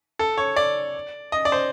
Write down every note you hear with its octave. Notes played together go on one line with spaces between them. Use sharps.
A4
C#5
D5
D#5
D5
C5